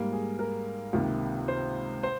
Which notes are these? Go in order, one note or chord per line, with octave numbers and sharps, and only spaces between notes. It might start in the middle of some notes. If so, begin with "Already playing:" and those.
Already playing: G#2 G3 A#3
G#4
A#4
C#2 C3 D#3 A#3
C5
C5